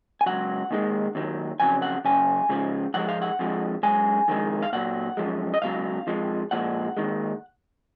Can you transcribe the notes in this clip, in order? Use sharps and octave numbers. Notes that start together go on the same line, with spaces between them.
G#5
C#2 B2 F#3 F#5
D#2 D#3 G#3
D#2 D#3 F#3
F2 C#3 F#3 G#5
F#5
F#2 C#3 G#5
C#2 C#3 F3
G#2 F3 G#3 F#5
F5
F#5
F2 F3 G#3
F#2 D#3 G#3 G#5
F2 D#3 G#3
F5
A#2 F#3 F#5
F#2 F3 G#3
D#5
C#2 B2 F#3 F5
F2 F3 G#3
A#2 F3 G#3 F#5
D#2 D#3 G#3